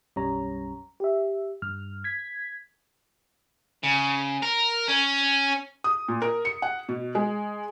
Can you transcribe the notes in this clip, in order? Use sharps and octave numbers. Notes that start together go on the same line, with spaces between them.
B1 F#2 G3 C#4 C#5 A#5
G4 E5
G2 F6
G#6 B6
C#3
A#4
C#4
D#6
A#2
A#4
C#7
F#5
B2
G#3